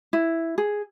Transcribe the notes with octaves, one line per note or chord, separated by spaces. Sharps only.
E4
G#4